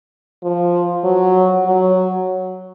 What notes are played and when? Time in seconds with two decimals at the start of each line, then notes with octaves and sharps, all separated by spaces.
0.43 F3
1.04 F#3
1.66 F#3